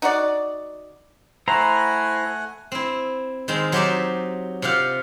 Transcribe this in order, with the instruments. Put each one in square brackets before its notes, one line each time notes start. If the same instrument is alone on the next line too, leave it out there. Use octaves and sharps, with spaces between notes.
[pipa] D#4 F#4 D5
[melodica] A3 F#5 G#5 [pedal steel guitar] E4 C5 A#5
[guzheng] C4 E4
D#3 G#3 C4
F#3 D#4 G4 C5 D5 E5
C3 F4 G4 F5 F#5